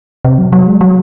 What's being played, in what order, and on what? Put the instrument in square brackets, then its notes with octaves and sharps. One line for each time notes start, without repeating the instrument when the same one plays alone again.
[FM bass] C3
F#3
F#3
G#3
F#3